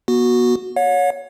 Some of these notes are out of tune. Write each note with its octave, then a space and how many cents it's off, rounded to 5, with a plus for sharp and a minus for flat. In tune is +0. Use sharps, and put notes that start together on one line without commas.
B3 -35 F#4 -5
C#5 +15 F#5 -45